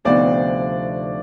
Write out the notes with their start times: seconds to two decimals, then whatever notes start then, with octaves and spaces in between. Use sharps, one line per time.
0.05 D2 C3 F3 B3 D#4 D5